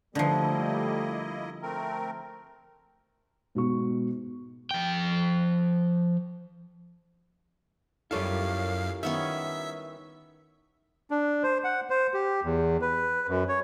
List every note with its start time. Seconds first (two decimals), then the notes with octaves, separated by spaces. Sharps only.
0.15 D3 F3 G3 A3 A#3 E4 D#5
1.62 A3 C4 A#4
3.55 G#2 B2 B3 C#6
4.71 F3 G5
8.11 F#2 G3 E4 F4 A4 A#4 C#5 F5
9.03 D#3 B3 C#4 E5
11.11 D4
11.43 C5
11.64 F#5
11.90 C5
12.14 G4
12.44 E2
12.81 B4
13.28 F#2
13.49 C#5